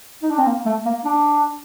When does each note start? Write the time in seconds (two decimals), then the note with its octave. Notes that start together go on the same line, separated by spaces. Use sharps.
0.23 D#4
0.31 D4
0.38 C4
0.47 A#3
0.66 A3
0.85 A#3
1.05 D4